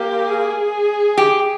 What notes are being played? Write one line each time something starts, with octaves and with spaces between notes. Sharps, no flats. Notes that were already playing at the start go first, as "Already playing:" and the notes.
Already playing: A#3 G4
G#4
G4